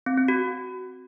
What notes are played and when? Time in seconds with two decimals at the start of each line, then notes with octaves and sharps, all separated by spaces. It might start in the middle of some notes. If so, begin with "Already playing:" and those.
0.06 C4
0.17 C4
0.28 F#4